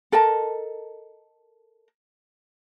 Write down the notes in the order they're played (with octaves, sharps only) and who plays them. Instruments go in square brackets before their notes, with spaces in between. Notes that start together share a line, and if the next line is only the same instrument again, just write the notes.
[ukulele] A4 A#4 D#5 A5